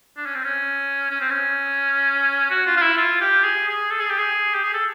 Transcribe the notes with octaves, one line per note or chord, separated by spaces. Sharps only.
D4
C#4
C4
C#4
C#4
C4
C#4
F#4
F4
F4
E4
F4
G4
G#4
G#4
A4
G#4
G4
G#4
G4
G#4
A4